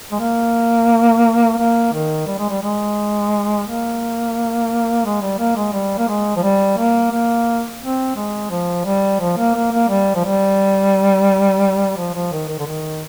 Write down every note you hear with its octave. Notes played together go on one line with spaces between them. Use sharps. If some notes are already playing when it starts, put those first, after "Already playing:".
G#3
A#3
A#3
D#3
G3
G#3
G3
G#3
A#3
G#3
G3
A#3
G#3
G3
A#3
G#3
F3
G3
A#3
A#3
C4
G#3
F3
G3
F3
A#3
A#3
A#3
G3
F3
G3
F3
F3
D#3
D#3
D3
D#3